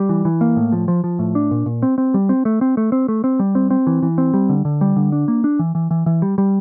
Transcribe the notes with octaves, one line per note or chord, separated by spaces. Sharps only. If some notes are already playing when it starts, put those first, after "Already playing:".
Already playing: G3
E3
E3
A#3
A2
F3
F3
F3
A2
D4
A#2
A#2
C4
C4
G3
C4
A3
C4
A3
C4
A3
C4
G3
C4
C4
E3
E3
C4
G3
D3
D3
G3
D3
D4
A#3
D4
E3
E3
E3
E3
G3
G3